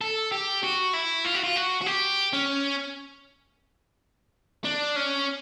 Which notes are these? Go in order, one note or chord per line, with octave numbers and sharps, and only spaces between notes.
A4
G4
F#4
E4
F4
F#4
F4
F#4
F#4
G4
C#4
D4
C#4